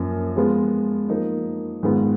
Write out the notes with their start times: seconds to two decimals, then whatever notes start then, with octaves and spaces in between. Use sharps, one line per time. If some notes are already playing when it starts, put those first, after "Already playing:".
Already playing: F#2 F3 A#3
0.36 F3 G#3 B3 F4
1.09 F3 A#3 D#4
1.83 G#2 D#3 G#3 B3 F4